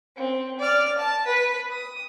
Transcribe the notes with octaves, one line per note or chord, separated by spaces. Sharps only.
C4
D5 F6
A5
B4
D#6